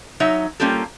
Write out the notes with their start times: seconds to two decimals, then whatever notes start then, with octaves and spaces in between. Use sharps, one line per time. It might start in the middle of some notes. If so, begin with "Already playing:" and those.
0.20 F#3 D#4 C#5 E5
0.60 G3 A#3 C#4 F4 G4 A4